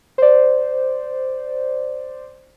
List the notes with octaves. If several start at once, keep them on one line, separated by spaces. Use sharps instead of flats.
C5 D5